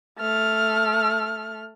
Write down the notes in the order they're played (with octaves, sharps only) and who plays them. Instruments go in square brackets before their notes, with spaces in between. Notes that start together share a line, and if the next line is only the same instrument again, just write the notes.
[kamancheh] A3 F6